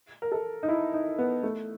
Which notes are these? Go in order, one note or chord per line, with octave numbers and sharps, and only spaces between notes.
A#4
A4
D#4
E4
D#4
B3
A3